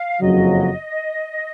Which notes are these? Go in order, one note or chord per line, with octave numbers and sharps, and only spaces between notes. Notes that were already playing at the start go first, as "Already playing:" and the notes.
Already playing: F5
F#1 F2 C#3 F#3 D#5